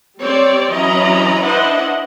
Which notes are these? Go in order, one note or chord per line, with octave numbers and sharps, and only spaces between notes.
G3 C4 C#5 D5
E3 F#3 C#4 D#5 A#5 B5
D4 E4 B4 C5 D#5 F#5